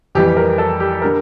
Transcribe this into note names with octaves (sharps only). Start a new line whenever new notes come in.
F2 E3 G3 G4
A#4
A4
G4
D3 G3 A#4